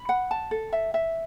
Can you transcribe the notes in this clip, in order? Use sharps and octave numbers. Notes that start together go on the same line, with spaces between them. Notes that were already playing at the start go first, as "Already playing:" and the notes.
Already playing: B5
F#5
A5
A4
E5
E5